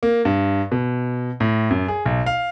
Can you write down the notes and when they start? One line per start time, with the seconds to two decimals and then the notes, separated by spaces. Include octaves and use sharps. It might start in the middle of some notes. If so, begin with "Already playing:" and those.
0.03 A#3
0.25 G2
0.72 B2
1.40 A2
1.70 F#2
1.88 G#4
2.05 B1
2.26 F5